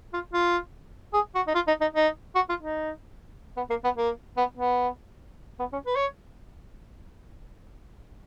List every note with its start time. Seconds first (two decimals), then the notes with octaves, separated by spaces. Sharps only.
0.13 F4
0.33 F4
1.14 G#4
1.35 F#4
1.48 D#4
1.55 F4
1.68 D#4
1.81 D#4
1.95 D#4
2.35 F#4
2.49 F4
2.62 D#4
3.57 B3
3.70 A#3
3.84 B3
3.97 A#3
4.37 B3
4.57 B3
5.59 B3
5.73 C#4
5.86 B4
5.96 C#5